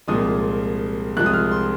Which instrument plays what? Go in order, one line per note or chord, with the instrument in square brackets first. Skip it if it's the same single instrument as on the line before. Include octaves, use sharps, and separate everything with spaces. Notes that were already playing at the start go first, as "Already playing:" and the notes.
[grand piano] C2 A#2 F3 G#3 D#6
C2 C3 F3 G#3 F#6
D#6
F6
C6